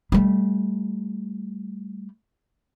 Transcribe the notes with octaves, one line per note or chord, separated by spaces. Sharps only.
G3 A3